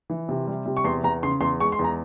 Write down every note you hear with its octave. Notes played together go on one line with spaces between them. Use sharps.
E3
C3
G3
C3
C#6
E2 C6
E2 A#5
C#3 C6
E2 C6
G#3 C#6
C6
E2
A#5